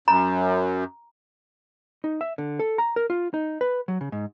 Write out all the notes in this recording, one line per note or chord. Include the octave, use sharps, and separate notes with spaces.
F#2 A#5
D#4
E5
D3
A4
A#5
A#4
F4
D#4
B4
F#3
C#3
G#2